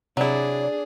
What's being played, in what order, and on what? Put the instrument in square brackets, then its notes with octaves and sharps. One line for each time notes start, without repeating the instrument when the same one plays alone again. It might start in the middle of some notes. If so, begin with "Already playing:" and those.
[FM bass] C3 [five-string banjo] F#3 E4 [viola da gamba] D4 G#4 [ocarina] D5